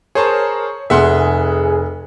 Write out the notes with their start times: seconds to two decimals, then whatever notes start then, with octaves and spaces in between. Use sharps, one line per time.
0.15 G#4 A#4 C5 C#5 A5
0.90 F1 G#4 E5 F#5 C6